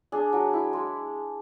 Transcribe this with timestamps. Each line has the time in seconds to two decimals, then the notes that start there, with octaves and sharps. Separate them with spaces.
0.12 D4 G#4
0.33 F#3
0.53 E4
0.73 G#3